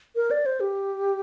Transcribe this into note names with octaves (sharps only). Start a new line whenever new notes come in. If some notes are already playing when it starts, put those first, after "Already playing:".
A#4
D5
C5
G4